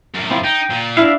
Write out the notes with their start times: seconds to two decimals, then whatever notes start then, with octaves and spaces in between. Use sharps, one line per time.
0.15 F#2 A2
0.31 C4 E4 F4
0.44 D#4 G5
0.70 A#2
0.97 D4 E4 E5 F5